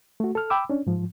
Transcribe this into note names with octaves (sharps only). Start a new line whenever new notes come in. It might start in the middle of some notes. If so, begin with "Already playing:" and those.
A3 F#4
A4 F6
G5 B5 D6 E6
C#4 D4
G#2 F3